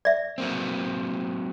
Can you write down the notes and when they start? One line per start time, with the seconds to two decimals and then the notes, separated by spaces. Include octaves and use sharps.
0.05 D5 E5
0.38 F#3 A#3 C4